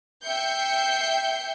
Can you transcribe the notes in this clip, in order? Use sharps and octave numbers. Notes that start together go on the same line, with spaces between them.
E5 G5 G6 C7 C#7